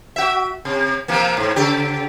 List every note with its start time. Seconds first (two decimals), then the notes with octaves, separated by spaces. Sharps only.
0.16 F#4 E5
0.65 C3
1.08 C3 F3 A#3
1.37 G#2
1.56 C#3 G4